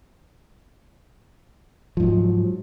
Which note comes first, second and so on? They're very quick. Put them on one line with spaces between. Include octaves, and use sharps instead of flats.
F3 G#2 F#3